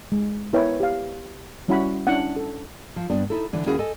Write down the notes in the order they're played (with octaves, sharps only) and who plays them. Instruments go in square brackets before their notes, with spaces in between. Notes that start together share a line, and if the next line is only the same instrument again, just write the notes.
[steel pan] G#3
B3 E4 A#4 B4 C#5 G5
G4 F5
G3 C#4 E4 F#4 F#5 B5
C#4 D4 E4 F#5
A4
[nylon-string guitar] F3
G2 B3 D4
D#4 E4 A4
D3 E3 D4
D#2 C#4 E4 F#4 G#4 F#5
A4 D#5 G#5